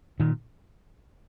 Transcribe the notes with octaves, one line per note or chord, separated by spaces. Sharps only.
A#2 D#3